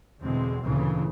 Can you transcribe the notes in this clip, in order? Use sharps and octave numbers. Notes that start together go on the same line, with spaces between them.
E2 B2 D3 G#3 C4
D2 A#2 C#3 E3